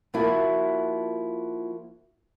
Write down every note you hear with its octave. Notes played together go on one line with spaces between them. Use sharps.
F3 A#3 E4 F#4